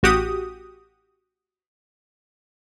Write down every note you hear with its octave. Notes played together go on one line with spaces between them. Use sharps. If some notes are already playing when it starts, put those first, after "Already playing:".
A1 F#4 G4 D#6